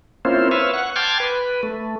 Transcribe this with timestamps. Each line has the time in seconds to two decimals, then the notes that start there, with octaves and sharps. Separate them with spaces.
0.25 A#3 C4 C#4 E4 F4 C5
0.51 B4 C#5 E5 F5
0.74 F#5 C#6
0.96 G5 A5 C6 D6 F6 G#6
1.20 B4
1.63 A3